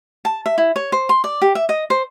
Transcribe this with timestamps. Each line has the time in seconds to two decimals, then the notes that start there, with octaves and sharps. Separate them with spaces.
0.25 A5
0.46 E5
0.58 E4
0.76 C#5
0.92 C5
1.09 C6
1.24 D5
1.42 G4
1.55 E5
1.69 D#5
1.90 C5